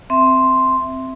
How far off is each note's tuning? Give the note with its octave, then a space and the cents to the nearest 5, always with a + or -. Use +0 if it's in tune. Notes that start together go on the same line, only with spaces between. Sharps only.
C4 -5 E5 +0 C6 +0